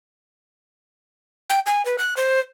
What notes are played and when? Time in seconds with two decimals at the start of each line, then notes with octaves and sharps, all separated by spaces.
1.50 G5
1.66 G#5
1.85 B4
1.98 F#6
2.17 C5